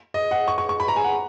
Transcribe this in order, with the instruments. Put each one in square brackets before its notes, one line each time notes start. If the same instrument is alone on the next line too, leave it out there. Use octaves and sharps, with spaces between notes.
[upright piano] D#5
F#5
C#6
C#6
C#6
B5
A#5
G#5
F#5